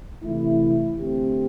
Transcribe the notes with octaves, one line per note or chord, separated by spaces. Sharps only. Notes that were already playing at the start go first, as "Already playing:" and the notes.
C3 E3 A3 E4
D3 A3 C4 G4